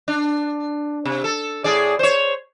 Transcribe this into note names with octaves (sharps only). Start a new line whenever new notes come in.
D4
C3
A4
A2 G#4 D5
C5 C#5